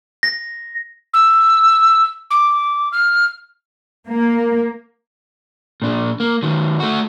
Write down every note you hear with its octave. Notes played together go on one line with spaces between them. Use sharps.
A#6
E6
D6
F6
A#3
A#2 D4
A#3
D#3 F#3
A3 F#4